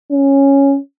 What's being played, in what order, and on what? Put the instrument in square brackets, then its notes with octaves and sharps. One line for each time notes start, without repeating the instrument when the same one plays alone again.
[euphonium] C#4